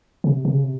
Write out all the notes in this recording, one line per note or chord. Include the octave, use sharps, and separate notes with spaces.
C#3
C3
C3
C#3
C3